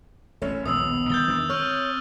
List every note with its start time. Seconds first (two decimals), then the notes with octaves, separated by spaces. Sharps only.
0.42 A1 C#4 C#5 E5
0.66 A#1 D#2 B2 B3 D#6 E6
1.10 D#3 F3 G3 G6 A6 G7
1.28 E2 D#3 D4
1.49 C4 C#5 C#6 E6 F6